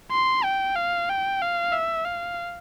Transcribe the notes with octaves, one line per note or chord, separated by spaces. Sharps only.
C6
G5
F5
G5
F5
E5
F5